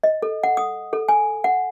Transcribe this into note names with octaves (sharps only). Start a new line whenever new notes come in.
D#5
A4
F#5
D#6
A4
G#5
F#5